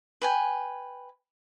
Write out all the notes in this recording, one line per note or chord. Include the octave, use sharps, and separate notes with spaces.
B4 G5 G#5